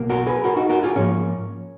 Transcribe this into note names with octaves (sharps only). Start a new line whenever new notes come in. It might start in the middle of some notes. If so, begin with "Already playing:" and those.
Already playing: B1 B2 A#3
F#4 A#4
G#4 B4
F#4 A#4
D#4 F#4
F#4 A#4
F4 G#4
G#2 F3 A#3 C#4